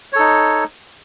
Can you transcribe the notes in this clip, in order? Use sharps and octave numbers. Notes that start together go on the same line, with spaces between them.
D#4 A4 C#5